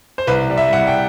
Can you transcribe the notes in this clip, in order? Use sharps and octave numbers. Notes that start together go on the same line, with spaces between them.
C5
C2 B4
G3
E5
C2 F#5
G5